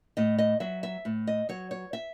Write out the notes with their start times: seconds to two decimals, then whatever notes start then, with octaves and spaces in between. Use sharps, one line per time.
0.17 A2 D#5
0.39 D#5
0.60 F#3 E5
0.83 E5
1.05 A2
1.27 D#5
1.49 F#3 C#5
1.71 C#5
1.93 E5